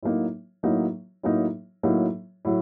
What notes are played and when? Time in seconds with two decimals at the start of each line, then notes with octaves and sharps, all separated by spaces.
0.03 A2 F#3 A#3 D#4
0.63 A2 F#3 A#3 D#4
1.23 A2 F#3 A#3 D#4
1.83 A2 F#3 A#3 D#4
2.45 A2 F#3